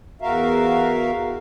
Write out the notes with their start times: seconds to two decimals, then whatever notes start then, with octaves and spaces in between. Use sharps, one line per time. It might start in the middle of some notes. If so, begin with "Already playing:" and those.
0.22 E2 F#4 A#4 E5 F5